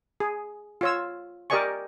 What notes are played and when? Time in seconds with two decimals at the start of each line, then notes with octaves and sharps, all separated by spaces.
0.20 G#4
0.81 F4 C#5 E6
1.50 G4 A#4 D5 D#5 G#5 C#6